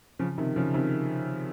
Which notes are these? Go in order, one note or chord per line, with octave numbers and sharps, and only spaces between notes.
C#3 F3
C3 D#3
C#3 F3
C3 D#3